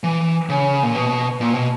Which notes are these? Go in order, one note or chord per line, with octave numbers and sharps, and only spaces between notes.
E3
C#3
A#2
B2
A#2
B2